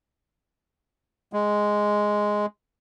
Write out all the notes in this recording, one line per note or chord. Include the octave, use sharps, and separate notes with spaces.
G#3